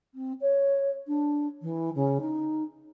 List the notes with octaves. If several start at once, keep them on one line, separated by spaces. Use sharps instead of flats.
C4
C#5
D4
E3
C#3
D#4